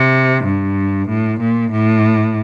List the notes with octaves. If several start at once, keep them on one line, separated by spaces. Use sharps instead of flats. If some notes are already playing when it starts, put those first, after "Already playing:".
Already playing: C3
G2
A2
A#2
A2